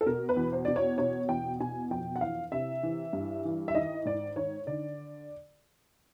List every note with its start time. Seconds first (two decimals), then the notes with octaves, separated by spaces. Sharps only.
0.01 A4
0.06 B2 A#4
0.29 B4
0.36 E2
0.52 C5
0.65 B2 D5
0.76 C#5
0.98 B2 C#5
1.29 E2 G5
1.60 B2 G#5
1.91 F2 G5
2.16 F#5
2.21 E3 F5
2.52 C3 E5
2.83 E3
3.13 G2
3.45 E3
3.68 E5
3.75 D#3 D#5
4.05 G#2 D5
4.36 D#3 C#5
4.67 D3 D5